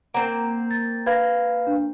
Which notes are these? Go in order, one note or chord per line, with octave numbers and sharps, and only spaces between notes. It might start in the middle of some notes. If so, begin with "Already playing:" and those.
A#3 C4 F#5 A#5
A6
B4 F5 G#6 A#6
D4